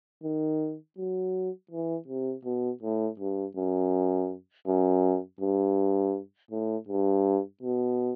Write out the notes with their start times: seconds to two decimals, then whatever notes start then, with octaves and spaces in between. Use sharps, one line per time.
0.24 D#3
0.98 F#3
1.71 E3
2.08 C3
2.45 B2
2.83 A2
3.19 G2
3.57 F#2
4.67 F#2
5.41 G2
6.51 A2
6.89 G2
7.63 B2